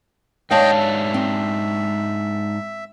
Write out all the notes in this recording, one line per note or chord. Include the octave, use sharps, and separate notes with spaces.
G#2 D4 C#5 D#5 F5 G5 A5
E5
C4